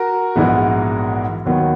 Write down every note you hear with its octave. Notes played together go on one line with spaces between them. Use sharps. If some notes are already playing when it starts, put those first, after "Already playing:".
Already playing: F#4 A#4
A#1 G#2 E3 G#3 B3
D#2 D#3 F#3 B3